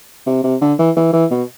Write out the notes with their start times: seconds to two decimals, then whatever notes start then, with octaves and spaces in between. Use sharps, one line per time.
0.26 C3
0.43 C3
0.61 D3
0.78 E3
0.96 E3
1.13 E3
1.31 B2